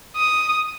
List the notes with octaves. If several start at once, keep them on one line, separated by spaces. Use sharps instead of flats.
D#6